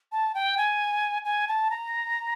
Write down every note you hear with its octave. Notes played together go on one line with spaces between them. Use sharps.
A5
G5
G#5
G#5
A5
A#5